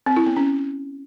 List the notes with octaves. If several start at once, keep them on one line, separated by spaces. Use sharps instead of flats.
C4
E4
B3
C#4